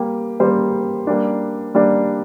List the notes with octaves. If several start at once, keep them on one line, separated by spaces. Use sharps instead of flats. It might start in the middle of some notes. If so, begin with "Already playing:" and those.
Already playing: G3 A#3 G4
G3 A#3 G4 C5
G3 A#3 D4
G3 A#3 D4